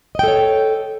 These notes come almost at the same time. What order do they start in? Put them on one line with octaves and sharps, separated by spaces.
D#5 G5 A4 C#5